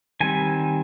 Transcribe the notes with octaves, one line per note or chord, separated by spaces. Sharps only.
D#3 G3 C4 G#5